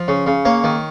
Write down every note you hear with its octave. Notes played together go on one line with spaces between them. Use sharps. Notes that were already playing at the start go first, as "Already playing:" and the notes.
Already playing: F3
C#3
C#3
A#3 C#5
D#3